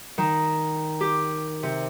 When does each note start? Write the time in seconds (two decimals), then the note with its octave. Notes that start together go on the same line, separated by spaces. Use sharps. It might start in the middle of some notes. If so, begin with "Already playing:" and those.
0.18 D#3
1.01 G4
1.63 C3